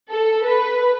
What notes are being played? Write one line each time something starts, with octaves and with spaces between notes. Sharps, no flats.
A4
B4